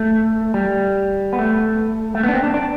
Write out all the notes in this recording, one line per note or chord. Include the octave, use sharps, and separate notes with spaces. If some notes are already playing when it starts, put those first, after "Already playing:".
Already playing: A3
G3
B3
A3
A3
B3 D4
C4
D4
D4